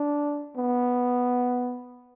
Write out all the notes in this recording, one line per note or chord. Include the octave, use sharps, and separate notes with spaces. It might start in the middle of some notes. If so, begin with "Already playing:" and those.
Already playing: D4
B3